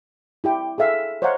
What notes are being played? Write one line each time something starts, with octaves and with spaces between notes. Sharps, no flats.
E4 G4 G5
G#4 A4 E5 F5
C5 C#5 D#5 F5 F#5 A#5